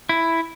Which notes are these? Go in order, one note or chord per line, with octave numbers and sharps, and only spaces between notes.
E4